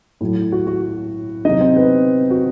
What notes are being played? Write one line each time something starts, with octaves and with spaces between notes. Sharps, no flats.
A2 F#3
F#4
F#4
C3 F#3 D#4 D#5
C4 C5
B3 B4
F#4